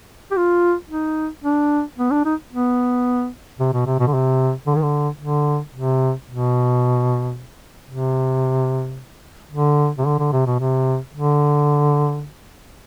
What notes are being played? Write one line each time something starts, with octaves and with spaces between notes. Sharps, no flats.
G4
F4
D#4
D4
B3
D4
D#4
B3
C3
B2
C3
B2
D3
C3
D3
D#3
D3
D3
C3
B2
C3
D3
C3
D3
D3
C3
B2
C3
D3